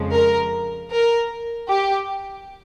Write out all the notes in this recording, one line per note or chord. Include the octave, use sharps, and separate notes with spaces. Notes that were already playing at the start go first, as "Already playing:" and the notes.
Already playing: F2 C#3 F3 G#3
A#4
A#4
G4